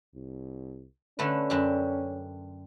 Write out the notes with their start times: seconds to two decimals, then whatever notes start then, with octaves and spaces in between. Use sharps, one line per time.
0.15 C2
1.19 D3 A3 C#4 B4
1.50 F#2 D4 G4